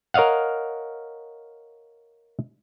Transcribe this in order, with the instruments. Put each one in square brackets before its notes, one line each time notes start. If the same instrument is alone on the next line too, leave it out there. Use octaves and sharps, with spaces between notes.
[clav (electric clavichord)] A#4 C#5 D#5 F5 F#5